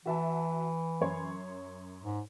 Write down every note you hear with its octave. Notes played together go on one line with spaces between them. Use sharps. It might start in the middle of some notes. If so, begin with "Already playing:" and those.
E3 F#4 E5 A5
F#2 C#5 C6
G#2